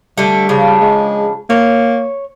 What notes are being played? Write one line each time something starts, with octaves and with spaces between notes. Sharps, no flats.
D3 G3 A3
C#3 F3 D4
G#3
A#3 C#5